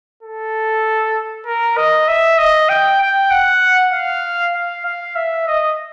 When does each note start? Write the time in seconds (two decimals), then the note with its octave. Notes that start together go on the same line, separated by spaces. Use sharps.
0.23 A4
1.47 A#4
1.77 D#5
2.08 E5
2.38 D#5
2.69 G5
3.01 G5
3.31 F#5
3.93 F5
4.55 F5
4.85 F5
5.16 E5
5.48 D#5